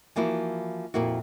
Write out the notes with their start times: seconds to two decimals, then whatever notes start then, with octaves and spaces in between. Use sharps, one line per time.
0.16 E3 F3 A#3 E4 F#4
0.94 F2 A#2 A#3 E4 F#4